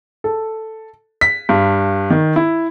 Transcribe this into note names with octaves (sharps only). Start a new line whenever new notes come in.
A4
B6
G2
D#3
E4